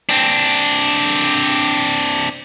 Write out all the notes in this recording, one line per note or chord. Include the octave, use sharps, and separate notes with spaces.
C4 D4